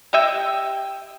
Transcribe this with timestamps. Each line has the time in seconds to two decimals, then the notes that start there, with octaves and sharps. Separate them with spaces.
0.13 G4 D#5 E5 G5